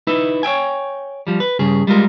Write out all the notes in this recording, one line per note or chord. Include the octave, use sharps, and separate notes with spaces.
D#4 E4 B4 E5
C#5 E5 G5 G#5
F3 G3
B4
G2 C#3 G#4
G3 G#3 F4 A#4